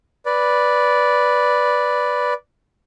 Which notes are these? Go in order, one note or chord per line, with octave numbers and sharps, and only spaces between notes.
B4 D5